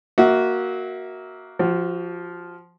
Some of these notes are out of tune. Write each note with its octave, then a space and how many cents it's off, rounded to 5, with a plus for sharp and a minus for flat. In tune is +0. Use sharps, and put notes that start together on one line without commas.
A#3 +0 F#4 +0 E5 -30
F3 +0 F#4 +35